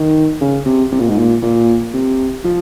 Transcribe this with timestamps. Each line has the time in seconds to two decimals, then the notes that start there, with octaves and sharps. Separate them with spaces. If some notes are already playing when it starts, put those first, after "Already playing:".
Already playing: D#3
0.41 C#3
0.66 C3
0.92 C3
1.00 A#2
1.09 G#2
1.18 A#2
1.42 A#2
1.94 C3
2.44 F3